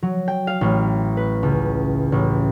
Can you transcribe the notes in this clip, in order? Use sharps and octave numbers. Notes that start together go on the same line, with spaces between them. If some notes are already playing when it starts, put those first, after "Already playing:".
F#3
G5
F5
A1
B4
C#2
A1